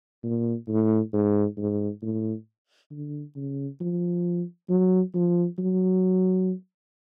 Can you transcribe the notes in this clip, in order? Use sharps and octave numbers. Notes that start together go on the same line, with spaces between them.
A#2
A2
G#2
G#2
A2
D3
C#3
F3
F#3
F3
F#3